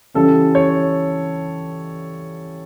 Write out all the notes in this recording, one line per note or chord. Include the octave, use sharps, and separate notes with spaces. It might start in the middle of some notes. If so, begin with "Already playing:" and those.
C#3 E3 G3 C#4 A4
C#5